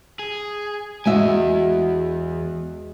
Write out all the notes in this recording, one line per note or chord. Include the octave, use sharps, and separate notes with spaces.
G#4
E2 G#3 F#4 E5 G#5